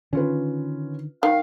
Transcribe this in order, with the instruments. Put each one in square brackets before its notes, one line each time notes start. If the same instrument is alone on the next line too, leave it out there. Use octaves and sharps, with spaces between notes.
[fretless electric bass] D3 D#3 [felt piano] C#4 F4 B4
[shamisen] D#3 [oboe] F5